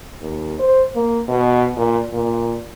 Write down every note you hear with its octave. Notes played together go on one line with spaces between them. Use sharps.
D#2
C5
A#3
B2
A#2
A#2